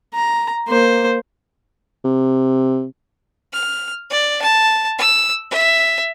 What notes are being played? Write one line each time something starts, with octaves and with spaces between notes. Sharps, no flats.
A#5
A#3 C5
C3
F6
D5
A5
E6
E5